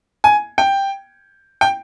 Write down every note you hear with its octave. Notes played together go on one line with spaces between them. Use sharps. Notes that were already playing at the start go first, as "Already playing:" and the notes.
G#5
G5
G5